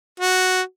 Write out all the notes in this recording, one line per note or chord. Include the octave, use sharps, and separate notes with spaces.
F#4